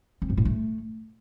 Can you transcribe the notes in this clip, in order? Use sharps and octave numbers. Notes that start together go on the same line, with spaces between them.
C4
G#2
A2
A3